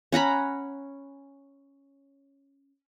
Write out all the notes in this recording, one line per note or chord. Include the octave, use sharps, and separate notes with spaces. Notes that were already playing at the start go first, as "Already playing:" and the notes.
C#4 F#5 A#5 B5